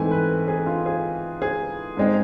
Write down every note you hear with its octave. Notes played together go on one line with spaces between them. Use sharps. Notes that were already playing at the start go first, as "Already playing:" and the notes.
Already playing: G#2 E3 A3 C4 G#5
B4
G#4
F4
G#4
G#4
G#2 G#3 C4